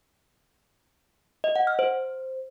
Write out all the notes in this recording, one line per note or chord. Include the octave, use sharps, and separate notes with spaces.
D#5
F#5
F6
C5